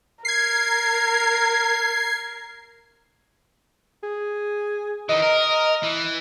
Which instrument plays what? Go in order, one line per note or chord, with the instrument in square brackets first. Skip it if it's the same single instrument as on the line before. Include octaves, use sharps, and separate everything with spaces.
[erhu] A#4 [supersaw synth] G#6 C7
[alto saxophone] G#4
[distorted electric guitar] D#3 E3 [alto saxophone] D#5
[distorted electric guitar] A#4
E3